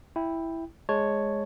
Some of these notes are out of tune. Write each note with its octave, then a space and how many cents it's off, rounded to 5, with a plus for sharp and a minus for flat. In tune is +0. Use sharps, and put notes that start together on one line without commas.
E4 +0 G5 +10
G#3 +0 C#5 +0 A5 +0